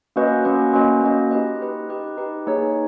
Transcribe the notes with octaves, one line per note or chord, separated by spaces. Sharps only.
A#3 C#4 F#4 B4 D#5
A#3 C#4 F#4 B4 D#5
A#3 C#4 F#4 B4 D#5
A#3 C#4 F#4 B4 D#5
D#4 G4 B4 D#5
D#4 G4 B4 D#5
D#4 G4 B4 D#5
D#4 G4 B4 D#5
A#3 D#4 G#4 C#5